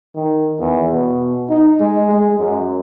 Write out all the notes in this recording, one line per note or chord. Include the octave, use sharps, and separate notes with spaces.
D#3
E2
B2
D#4
G#3
G#3
F#2